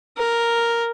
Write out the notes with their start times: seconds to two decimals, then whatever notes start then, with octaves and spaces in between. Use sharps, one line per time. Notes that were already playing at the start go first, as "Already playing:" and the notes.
0.17 A#4